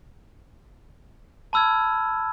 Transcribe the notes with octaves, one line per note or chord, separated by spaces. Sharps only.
A5 B5 E6 F6 G#6